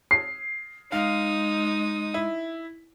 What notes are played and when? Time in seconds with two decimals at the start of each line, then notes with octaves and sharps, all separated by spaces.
0.11 C7
0.92 G#3 D#4 F5 D#6
2.14 E4